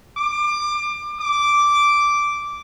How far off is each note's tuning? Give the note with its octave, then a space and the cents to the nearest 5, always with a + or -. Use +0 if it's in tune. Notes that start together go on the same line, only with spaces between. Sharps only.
D6 +25
D6 -5